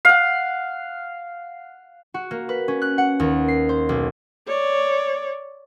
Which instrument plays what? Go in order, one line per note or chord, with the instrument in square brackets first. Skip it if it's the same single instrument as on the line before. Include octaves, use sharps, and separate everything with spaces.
[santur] F5 F#5
[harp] F#4
A#3
B4
C#4
F#6
F#5
D#2
C7
C5
B1
[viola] C#5 D5